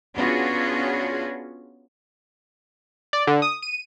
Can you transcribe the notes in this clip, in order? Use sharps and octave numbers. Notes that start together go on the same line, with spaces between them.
B3 C#4 D4 F4 F#4 G#4
D5
D3
D#6
D#7